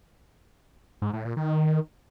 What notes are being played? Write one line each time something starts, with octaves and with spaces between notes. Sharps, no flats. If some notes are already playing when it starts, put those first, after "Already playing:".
G#2
A2
A#2
D#3